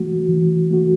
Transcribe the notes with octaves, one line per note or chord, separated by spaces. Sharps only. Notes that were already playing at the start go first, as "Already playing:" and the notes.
Already playing: E3 A3 F#4
E3
A3 F#4